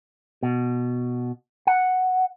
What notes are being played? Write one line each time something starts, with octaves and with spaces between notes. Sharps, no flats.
B2
F#5